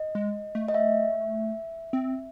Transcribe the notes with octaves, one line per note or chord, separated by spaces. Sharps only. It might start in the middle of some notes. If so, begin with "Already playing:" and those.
Already playing: D#5
G#3
A3
D#5
E5
C4